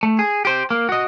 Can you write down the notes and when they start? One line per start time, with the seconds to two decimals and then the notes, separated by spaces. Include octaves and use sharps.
0.03 A3
0.19 G#4
0.45 G4 C5
0.70 A#3
0.89 F#4 D#5